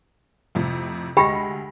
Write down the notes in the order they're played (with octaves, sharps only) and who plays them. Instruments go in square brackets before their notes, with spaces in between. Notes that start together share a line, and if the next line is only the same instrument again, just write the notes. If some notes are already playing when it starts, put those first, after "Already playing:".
[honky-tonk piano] F2 A2 C3
[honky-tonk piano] D2 G#3 A#6 [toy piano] G4 G5 B5